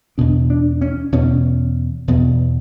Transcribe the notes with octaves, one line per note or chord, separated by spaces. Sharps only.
E2 B2 D4
D4
C#4
E2 B2 C#4
E2 B2